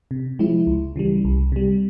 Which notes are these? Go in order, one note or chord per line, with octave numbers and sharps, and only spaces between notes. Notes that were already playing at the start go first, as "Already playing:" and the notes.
C3
F3 G#3 E4
C#2
C#3 E3 G3
C2
C3 G3